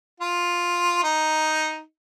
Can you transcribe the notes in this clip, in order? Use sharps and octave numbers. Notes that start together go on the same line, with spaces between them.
F4
D#4